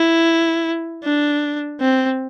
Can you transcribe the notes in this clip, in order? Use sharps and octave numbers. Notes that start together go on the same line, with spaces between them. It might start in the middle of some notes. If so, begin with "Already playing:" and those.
Already playing: E4
D4
C4